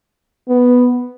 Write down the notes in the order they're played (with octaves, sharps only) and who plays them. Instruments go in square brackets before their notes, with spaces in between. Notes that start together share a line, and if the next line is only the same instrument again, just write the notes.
[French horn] B3